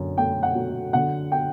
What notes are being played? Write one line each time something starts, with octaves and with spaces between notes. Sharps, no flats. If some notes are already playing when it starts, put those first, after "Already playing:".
Already playing: F#2 D3
A3 G5
F#5
F#3
D3 F#5
G5